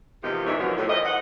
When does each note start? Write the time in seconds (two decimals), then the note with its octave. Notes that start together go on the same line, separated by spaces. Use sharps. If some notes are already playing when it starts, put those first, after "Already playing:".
0.24 E2 C3 D#3 F3 G#3 D#4
0.46 G#2 D#3 E3 D4 C#5 E5
0.59 B2 D3 D#3 F3 F#3
0.77 A2
0.89 E3 A#4 C5 D#5
1.05 F#5